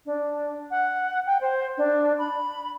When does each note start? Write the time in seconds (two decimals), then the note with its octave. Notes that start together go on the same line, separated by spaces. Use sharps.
0.06 D4
0.71 F#5
1.26 G5
1.41 C5
1.78 D4
2.19 B5